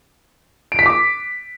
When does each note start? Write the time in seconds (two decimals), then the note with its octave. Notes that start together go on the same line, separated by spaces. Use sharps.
0.72 D7
0.79 B6
0.86 D6